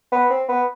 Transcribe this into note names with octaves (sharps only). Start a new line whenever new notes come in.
B3
C4
B3